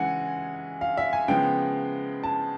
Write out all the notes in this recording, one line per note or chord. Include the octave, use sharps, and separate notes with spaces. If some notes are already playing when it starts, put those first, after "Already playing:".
Already playing: C#3 E3 G#3 F#5 G#5
F5
E5
G#5
C#3 F3 G#3 B3 G5
A5